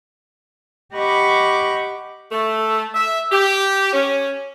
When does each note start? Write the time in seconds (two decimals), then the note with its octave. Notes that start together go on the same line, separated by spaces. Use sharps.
0.95 G4 D#5 F#5 B5 C#6 D6
2.32 A3
2.95 E5
3.32 G4
3.93 C#4